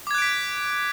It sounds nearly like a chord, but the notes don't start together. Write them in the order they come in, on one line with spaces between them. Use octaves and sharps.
D6 G#6 F#6 D7 B6